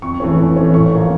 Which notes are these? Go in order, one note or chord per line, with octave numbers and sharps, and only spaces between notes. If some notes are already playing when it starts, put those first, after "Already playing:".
F2 C#6
E3 A3 C#4
F2
E3 A3 C#4
A1 C#6
A2 F3 A#3 C#4